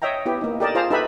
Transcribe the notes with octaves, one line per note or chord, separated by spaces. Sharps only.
C#5 D#5 E5 G5 A#5
B3 E4 G4
A#3 D#4
G4 A4 A#4 D5 D#5 A5
F4 G#4 C5 F5 A5 A#5
D#4 G4 A4 B4 E5 B5